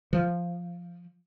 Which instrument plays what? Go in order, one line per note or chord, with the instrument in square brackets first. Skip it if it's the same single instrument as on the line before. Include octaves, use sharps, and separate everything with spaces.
[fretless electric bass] F3